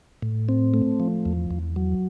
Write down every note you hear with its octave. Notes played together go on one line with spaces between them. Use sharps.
A2
C4
A3
F3
E2
E2
F#3